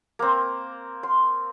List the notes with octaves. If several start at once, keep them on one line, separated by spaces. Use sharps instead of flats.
A#3 C4
C6